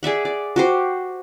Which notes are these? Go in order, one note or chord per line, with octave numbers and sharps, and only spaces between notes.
G#4 D5 E5 F#5
D5
F#4 G4 C5